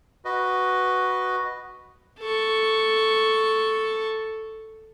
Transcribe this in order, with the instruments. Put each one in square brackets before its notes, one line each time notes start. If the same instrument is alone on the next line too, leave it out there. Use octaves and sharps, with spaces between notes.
[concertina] F#4 B4 D#5
[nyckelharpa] A4 C#6